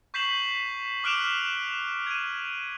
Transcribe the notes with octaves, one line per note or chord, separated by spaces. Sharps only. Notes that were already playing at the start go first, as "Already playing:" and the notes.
C#6 G6 B6 C7 E7 F#7
D6 F6 F#6 D7 E7 F7
G#6 D#7